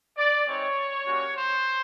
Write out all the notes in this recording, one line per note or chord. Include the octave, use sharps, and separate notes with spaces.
D5
G#3 C4 D#4 C#5
G3 A#3 C#4 F#4
C5